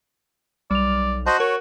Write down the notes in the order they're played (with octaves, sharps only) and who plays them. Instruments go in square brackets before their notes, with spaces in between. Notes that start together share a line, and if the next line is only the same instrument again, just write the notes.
[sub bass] B1 [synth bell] G3 F7 [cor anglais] D5
[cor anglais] F#4 [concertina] C5 D#5 [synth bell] A5 C#6
[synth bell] A#4 [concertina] C#5